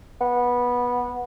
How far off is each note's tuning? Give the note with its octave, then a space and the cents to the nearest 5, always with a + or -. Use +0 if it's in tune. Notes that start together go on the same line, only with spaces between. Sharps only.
B3 -15